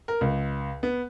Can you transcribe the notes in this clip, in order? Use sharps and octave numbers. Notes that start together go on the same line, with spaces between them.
A#4
C#2
B3